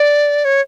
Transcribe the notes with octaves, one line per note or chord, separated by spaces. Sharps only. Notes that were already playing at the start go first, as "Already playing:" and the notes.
Already playing: D5
C#5